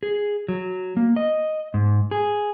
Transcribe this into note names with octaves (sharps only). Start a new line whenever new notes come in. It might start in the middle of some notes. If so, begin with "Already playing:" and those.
G#4
F#3
A#3
D#5
G#2
G#4